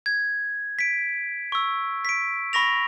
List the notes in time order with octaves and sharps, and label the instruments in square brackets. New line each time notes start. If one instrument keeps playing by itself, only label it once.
[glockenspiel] G#6
B6 D7
C#6 E6
B6 D7
B5 C#6 A#6 F7